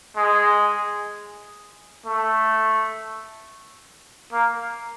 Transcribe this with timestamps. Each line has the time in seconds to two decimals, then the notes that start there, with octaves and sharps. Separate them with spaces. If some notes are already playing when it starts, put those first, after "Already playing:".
0.17 G#3
2.06 A3
4.32 A#3